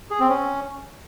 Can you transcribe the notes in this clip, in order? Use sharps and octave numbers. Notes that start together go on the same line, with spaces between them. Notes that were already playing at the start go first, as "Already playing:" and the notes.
G#4
C4
C#4